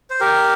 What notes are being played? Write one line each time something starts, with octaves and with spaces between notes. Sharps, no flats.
C5
G4 A#4